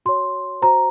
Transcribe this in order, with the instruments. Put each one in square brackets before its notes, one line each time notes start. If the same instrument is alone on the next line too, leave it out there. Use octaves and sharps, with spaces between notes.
[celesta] F#4 C#5 C6
F#4 C5 A#5